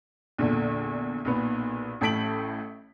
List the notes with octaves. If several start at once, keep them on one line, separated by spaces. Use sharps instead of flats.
A#1 E2 A#2 D3
B1 A#2 B3 B4
A1 A2 A5 B6 D7 F#7